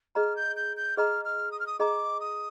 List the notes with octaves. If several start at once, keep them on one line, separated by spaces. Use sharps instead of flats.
G#4 D#5 A#5 F6
G6
G6
G6
G#4 D#5 A#5 F6
F6
D#6
F6
D#6
G#4 D#5 A#5 D6
D#6